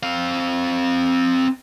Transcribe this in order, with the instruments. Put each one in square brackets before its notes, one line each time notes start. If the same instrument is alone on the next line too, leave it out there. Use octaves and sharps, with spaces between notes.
[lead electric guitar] C4 F5